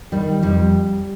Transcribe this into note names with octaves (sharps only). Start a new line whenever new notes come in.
D#3 G3
F2 G3